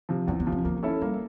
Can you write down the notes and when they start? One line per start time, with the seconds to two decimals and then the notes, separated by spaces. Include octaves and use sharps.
0.09 C3 F3
0.27 E2 C#4
0.40 B3
0.46 C3 F3
0.52 C#4
0.64 A#3 C#4
0.83 C#4 E4 A4
1.01 G3 A#3